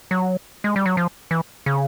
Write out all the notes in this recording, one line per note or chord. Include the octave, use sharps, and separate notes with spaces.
F#3
G#3
G3
F#3
F3
E3
C#3